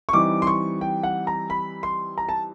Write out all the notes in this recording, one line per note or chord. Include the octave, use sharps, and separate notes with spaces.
C#6
E3 G3 C4 D#4 D6
C6
C#6
G5
F#5
A#5
B5
C6
A#5
A5